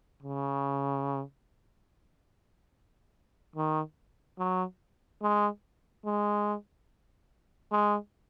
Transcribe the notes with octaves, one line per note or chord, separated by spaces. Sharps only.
C#3
D#3
F#3
G#3
G#3
G#3